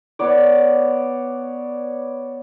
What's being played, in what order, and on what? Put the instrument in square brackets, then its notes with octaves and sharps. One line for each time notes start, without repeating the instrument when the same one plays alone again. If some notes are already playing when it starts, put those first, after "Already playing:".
[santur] B3 C#5 D5